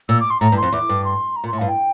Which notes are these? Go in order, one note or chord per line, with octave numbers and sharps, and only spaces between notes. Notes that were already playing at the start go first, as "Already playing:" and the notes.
A#2 E6
D6
C6
A2 A#5
G2
C6
F2
E2 D6
G2
C6
A#5
A#2
C6
A2
G2 F5
G5